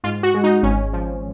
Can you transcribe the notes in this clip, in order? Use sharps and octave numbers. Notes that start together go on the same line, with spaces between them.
G#2 F4
F#4
G#3
D#4
G#1 C#4
F3